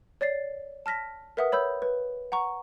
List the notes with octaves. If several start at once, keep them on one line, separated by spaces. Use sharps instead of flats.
C#5 D5 A6 C7
A5 F6 A#6 B6
A#4 B4 E5 F#5 D#6
C#5 B5 E6 G6
B4
F#5 A#5 C#6